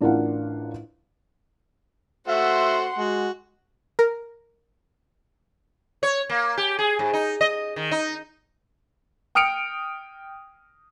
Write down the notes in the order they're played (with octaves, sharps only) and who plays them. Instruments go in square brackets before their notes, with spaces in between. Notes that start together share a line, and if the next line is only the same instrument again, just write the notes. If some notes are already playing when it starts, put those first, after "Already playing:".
[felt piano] A1 D4 F4 A#4 F5 F#5
[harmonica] A3 F#4 C5 [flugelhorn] E5 [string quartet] F#5 C6
[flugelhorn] G#3 [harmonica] F#4
[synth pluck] A#4
[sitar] C#5
A#3
G4
G#4
G#2
D#4
D#5
D#3
D#4
[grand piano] G5 D#6 F6 C#7 D7 F7